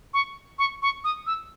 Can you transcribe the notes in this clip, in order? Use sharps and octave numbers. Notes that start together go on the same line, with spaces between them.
C#6
C#6
C#6
D#6
E6